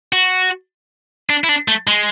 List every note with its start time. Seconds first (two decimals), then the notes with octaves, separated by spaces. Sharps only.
0.13 F#4
1.30 D4
1.44 E4
1.49 D4
1.68 A3
1.87 G#3